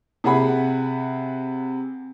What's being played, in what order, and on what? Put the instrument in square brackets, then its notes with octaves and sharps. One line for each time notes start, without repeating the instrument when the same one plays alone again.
[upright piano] C3 G#4 F#5 B5